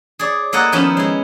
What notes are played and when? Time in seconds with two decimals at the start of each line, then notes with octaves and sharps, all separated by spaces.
0.19 G#4 C#5 D5
0.53 A#3 E4 A4 C#5 D#5 F#5
0.72 D#3 F3 B3 C#4 D#4 E4
0.97 G#3 E4